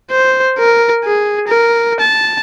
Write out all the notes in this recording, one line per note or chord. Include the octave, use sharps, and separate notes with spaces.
C5
A#4
G#4
A#4
A5